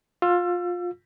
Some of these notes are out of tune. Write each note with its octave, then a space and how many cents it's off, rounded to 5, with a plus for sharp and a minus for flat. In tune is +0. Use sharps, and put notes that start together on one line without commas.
F4 +20 E6 +35